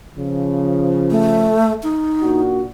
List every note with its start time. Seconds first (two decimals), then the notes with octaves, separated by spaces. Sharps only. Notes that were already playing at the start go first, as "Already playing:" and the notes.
0.17 C#3 F3
1.11 A3
1.83 D#4
2.22 A#2 D4 F#4